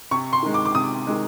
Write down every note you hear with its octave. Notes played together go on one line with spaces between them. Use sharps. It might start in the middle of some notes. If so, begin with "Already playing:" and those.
C3 C#6
C6
D#3 G#3
D6
D6
C3 D#6
D#3 G#3